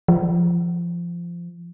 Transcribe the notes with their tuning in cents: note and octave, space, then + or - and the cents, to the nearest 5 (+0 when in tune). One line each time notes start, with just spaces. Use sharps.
F3 -20